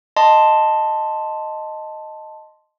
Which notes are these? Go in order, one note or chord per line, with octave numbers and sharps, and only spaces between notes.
D#5 A5 C6